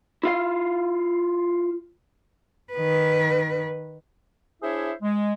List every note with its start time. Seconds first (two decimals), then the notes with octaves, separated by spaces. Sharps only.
0.23 E4 F4 F5
2.73 D#3 B4
4.63 D4 E4 G#4 C5 C#5 E5
5.02 G#3